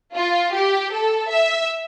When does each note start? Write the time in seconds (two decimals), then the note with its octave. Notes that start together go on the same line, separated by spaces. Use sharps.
0.15 F4
0.53 G4
0.92 A4
1.29 E5